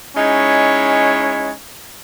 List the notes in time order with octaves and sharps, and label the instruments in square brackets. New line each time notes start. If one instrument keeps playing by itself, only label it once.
[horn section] G#3 C#4 D#4 E4 C#5